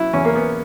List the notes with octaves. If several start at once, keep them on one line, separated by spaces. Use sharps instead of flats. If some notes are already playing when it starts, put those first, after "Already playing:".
Already playing: F#3 E4
E2 C#4
A#3
B3